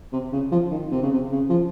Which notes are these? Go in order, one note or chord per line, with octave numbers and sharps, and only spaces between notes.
C3
C#3
F3
D#3
C3
C#3
C3
C#3
F3